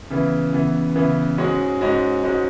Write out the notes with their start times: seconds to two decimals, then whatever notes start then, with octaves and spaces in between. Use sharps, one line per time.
0.10 C#3 E3 B3
0.53 C#3 E3 B3
0.95 C#3 E3 B3
1.38 G#2 G#3 C#4 F#4
1.81 G#2 G#3 C#4 F#4
2.24 G#2 G#3 C#4 F#4